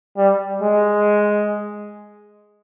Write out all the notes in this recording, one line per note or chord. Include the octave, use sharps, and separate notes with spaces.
G3
G#3